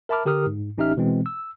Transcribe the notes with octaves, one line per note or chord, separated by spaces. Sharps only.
A#4 E5 A5 B5 D6 F6
D3 G4 A#4 D#6 F6
G#2
A1 C#4 D#4 G4 E5 F6
B2 E3 G#3 C4
E6